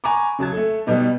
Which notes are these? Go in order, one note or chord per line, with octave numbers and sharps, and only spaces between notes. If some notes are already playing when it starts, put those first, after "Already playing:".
G#5 A#5 B5 C#6 D6
C#3 F#3 A5 G#6
A3 A4
B2 G3 B3 D#4